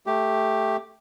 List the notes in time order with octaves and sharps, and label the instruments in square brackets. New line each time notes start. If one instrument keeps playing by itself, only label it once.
[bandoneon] A3 G4